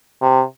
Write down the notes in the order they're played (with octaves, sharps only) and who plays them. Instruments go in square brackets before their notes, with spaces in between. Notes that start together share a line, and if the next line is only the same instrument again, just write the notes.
[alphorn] C3